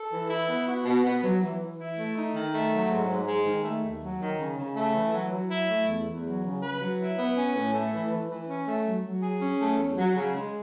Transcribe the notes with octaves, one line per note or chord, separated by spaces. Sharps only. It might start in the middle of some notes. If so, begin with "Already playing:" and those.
Already playing: A4
E3
E4
B3
F#4
B2
B3
F#3
E3
E3
E4
A3
D#4
D#3
A3
F#3
G#2
G#2
G#3
D#3
A3
D#2
F#3
D#3
C#3
C#3
A3
E3
F#3
F#3
E4
A3
E2
E2
F#3
C#3
B4
F#3
E4
B3
C#4
A2
A3
E3
E3
E3
C#4
A3
F#3
F#3
G#4
C#4
A3
E2
F#3
C#3
G#3